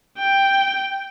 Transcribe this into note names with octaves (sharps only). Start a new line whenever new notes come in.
G5